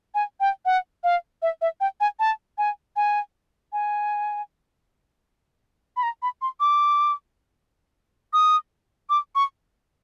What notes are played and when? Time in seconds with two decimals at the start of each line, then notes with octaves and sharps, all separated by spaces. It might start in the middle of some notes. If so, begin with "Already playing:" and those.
0.14 G#5
0.40 G5
0.65 F#5
1.04 F5
1.42 E5
1.61 E5
1.80 G5
2.00 G#5
2.19 A5
2.58 G#5
2.96 G#5
3.73 G#5
5.96 B5
6.03 A#5
6.22 B5
6.42 C6
6.60 D6
8.33 D#6
9.10 D6
9.35 C#6